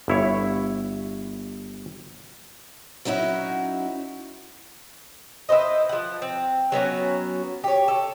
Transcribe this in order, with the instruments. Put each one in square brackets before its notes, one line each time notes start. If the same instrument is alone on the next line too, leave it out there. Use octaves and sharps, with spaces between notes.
[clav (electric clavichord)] G1 E4 C#5
[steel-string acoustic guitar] F#3 C#4 D#4 E4 F#4
[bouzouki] E4 B4 C5 D#5
F3 F#5
C4
F#3 B3 C#4 F#4
G4 C#5
A4